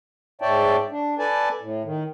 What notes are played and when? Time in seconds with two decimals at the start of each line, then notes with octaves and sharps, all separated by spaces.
0.41 G#2 C#5 D5 E5 G5 A5
0.91 D4
1.19 A4 B4 D5 G#5 A5
1.61 A2
1.84 D#3